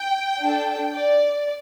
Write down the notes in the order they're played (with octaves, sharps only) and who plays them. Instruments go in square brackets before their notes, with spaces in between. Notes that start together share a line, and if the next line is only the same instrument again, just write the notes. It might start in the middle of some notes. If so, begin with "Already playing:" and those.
Already playing: [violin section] G5
D4 A4
D5